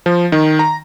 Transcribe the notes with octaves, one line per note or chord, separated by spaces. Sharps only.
F3
D#3
A#5